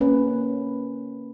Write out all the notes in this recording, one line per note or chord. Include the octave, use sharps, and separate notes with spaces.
A#3 C#4 B4